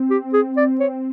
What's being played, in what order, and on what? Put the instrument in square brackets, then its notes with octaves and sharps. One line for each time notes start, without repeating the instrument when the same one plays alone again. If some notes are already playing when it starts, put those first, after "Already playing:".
Already playing: [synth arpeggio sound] C4
[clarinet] G4
G#4
D5
C#5